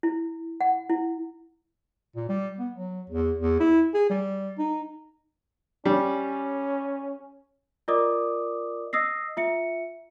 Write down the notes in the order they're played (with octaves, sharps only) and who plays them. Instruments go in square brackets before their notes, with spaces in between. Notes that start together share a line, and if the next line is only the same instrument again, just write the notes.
[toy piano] E4
F#5
E4
[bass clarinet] A#2
G3
B3
F#3
E2
E2
E4
G#4
G3
D#4
[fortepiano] G3 [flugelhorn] C#4
[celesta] F4 A#4 D5 D#5 D6 D#6
D#5 D#6 E6 A#6 C7
F4 E5 C#7